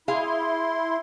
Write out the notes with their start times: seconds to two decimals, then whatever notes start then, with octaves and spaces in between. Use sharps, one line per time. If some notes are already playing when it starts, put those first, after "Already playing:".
0.08 E4 G#4 F5 C6